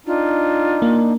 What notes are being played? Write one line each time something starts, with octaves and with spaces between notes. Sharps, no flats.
D4 D#4 F4
A#3